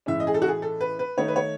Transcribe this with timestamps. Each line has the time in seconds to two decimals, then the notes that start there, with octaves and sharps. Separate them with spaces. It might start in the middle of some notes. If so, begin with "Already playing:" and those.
0.06 A2 E3 G#3 C#4 E5
0.20 D#5
0.27 G#4
0.34 A4
0.42 F#4
0.48 G#4
0.62 A4
0.81 B4
0.99 B4
1.17 D#3 A3 D#4 C#5
1.28 B4
1.36 C#5